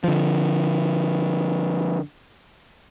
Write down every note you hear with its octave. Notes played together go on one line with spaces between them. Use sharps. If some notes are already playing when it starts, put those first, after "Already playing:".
D3 F3